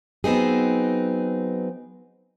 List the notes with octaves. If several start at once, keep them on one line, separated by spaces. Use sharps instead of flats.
F#3 B3 C4 D#4 G#4